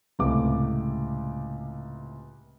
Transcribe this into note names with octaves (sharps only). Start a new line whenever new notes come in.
C#2 A2 C3 D6